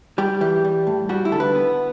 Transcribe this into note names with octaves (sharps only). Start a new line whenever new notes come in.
G3 G4
E3 G4
G3
A2
G3 F#4
E4
D3 A4
B4
B3